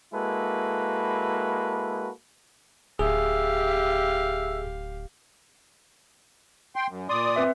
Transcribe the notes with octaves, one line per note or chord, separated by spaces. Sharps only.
G#3 A#3 E4 F#4 A4 B4
D1 G4 G#4 E5 F5 E6
G5 C6
F#2
A#2 D5 C6 D#6
C4 B4 E5